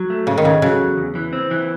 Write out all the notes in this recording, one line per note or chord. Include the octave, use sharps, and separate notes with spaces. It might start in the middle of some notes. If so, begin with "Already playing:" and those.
Already playing: F#3
A3
G#2 C#3
D#3
C#3 C#4
C#3 F#3
E2
E2
E3
C4
E3